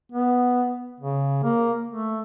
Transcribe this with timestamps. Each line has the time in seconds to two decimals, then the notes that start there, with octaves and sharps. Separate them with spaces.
0.12 B3
1.00 C#3
1.43 A#3
1.90 A3